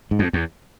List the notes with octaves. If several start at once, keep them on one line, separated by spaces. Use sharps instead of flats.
G#2
F2
E2